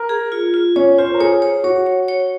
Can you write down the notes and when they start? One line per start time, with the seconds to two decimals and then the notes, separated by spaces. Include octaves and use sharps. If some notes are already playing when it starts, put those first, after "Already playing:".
Already playing: A#4
0.09 G#4
0.32 F4
0.54 F4
0.76 C#4 C#5
0.98 F4 C5
1.14 A#4
1.20 G#4 C#5
1.42 C#5
1.64 F#4 C#5
1.86 C#5
2.08 C#5